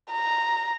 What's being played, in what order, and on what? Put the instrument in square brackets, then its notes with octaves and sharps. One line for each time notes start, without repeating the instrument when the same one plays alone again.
[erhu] A#5